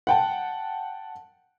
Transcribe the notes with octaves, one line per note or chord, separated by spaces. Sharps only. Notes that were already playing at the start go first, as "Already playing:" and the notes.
F#5 G5 A5